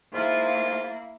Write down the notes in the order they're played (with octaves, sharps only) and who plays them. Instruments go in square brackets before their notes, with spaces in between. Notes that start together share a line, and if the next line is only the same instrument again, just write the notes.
[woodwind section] G#2 F4 [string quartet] A#3 E4